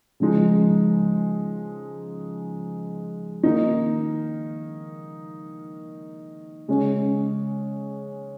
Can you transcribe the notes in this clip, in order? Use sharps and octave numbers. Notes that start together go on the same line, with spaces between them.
C#3 F3 G#3 D#4
D#3 A#3 D#4
C#3 G#3 C#4